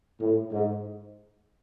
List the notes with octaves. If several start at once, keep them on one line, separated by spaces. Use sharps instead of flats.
A2
G#2